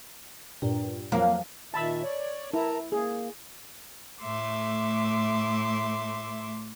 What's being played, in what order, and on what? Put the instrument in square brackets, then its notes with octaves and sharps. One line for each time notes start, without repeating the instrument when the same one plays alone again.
[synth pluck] G2 A#2
[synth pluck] F2 F3 F#3 [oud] A#3
[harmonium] A#2 D#3 E5 [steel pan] A5 B5 E6
[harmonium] C#5 D5
[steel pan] E4 [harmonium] A#4 A5 A#5
[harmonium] A#3 [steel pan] G#4
[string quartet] A2 A3 E5 C6 D6